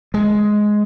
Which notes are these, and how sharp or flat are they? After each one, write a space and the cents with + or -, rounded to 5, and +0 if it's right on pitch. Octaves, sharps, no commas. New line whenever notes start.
G#3 +10